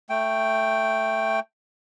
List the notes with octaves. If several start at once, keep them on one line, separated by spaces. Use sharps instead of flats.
A3 G5